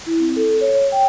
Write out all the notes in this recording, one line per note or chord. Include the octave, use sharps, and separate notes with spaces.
E4
C4
A4
C#5
G5